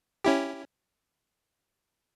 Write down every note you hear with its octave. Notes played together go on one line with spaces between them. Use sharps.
C#4 E4 G4